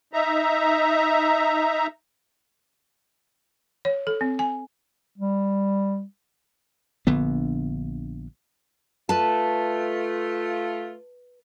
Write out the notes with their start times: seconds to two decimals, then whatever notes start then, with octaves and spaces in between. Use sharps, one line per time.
0.13 D#4 E5 A#5
3.85 C#5
4.07 A4
4.21 C4
4.39 G#5
5.18 G3
7.07 A#1 D3 B3
9.09 A3 F4 B4 A5